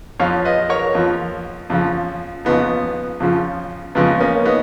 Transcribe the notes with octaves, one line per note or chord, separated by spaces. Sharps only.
F2 F3 C#5 F5
B4 D#5
A#4 C#5
F2 F3
F2 C#3 F3
F2 C#3 F3 B3 D#4
F2 C#3 F3
F2 C#3 F3 G#3 B3
A#3 C#4
B3 D#4